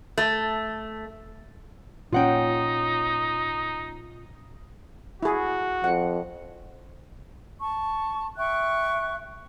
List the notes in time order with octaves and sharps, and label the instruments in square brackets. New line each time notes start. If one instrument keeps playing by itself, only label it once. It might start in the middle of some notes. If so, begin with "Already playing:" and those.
[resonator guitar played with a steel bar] A3
[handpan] A#2 C#4 [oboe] D#4 [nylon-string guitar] F4 F#5 G5
[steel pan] E4 G#4 [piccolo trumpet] F#4
[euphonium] F2 [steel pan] F#5
[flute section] A5 C#6
E5 G5 C#6 F#6